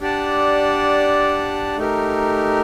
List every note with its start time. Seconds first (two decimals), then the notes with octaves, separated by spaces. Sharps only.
0.01 D4 G4 D5 F#5 A5
1.77 A3 D#4 G4 A#4